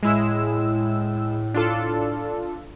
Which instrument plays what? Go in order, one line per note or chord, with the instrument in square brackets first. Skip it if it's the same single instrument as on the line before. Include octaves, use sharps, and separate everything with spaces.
[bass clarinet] A2 [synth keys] G#3 E4 E6
[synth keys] D4 F4 A4